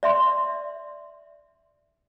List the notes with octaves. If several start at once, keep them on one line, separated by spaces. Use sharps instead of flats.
D5 E5 C6